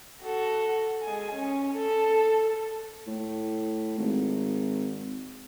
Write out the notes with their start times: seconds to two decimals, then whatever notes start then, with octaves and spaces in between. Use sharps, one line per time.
0.22 F#4 A4
1.03 G#3 G#5
1.35 C#4
1.76 A4
3.07 A2
3.98 G#1